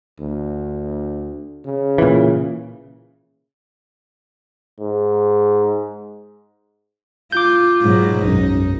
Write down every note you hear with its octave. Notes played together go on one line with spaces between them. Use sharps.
D2
C#3
A#2 E3
G#2
F4 D6 G6
G#2 B2 F#3
B1 F#2 D#4